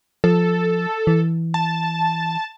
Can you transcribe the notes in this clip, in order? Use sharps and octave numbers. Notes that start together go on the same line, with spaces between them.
F3 A4
E3
A5